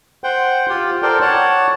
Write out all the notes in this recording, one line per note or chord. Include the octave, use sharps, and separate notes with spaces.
C5 F#5 G5
F4 G4
A4 A#4 C5 D5 G5
C#5 F#5 A5